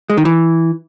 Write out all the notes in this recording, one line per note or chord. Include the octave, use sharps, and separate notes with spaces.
G#3
D#3
E3